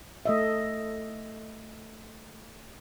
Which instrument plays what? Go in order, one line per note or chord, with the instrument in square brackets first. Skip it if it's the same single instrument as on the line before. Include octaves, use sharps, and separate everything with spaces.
[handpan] A3 D#5 E5